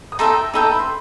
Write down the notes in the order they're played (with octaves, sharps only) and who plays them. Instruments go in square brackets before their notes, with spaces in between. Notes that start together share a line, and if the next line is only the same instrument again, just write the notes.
[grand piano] D#6
[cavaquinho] D#4 A4 E5 G5 [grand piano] C6
[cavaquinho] D#4 A4 E5 G5 [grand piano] B5
[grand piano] A5
B5
C6